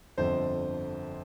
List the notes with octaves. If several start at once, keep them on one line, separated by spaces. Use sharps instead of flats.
G1 F2 D3 C5